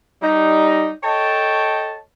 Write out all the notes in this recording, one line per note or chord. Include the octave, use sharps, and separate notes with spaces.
G3 D#4
A4 C#5 D#5 G5 A5